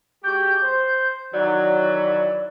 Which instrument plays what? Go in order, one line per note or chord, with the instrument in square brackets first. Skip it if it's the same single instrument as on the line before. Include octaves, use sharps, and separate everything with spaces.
[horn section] G#3 F#4 G4 [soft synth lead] G6
[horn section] C5
[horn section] D#3 E3 F#3 [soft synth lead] D5